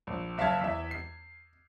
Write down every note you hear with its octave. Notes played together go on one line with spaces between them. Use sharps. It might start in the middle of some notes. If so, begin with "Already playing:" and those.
A#1
F#1 E5 F5 A5 G#6
E2 E5
C7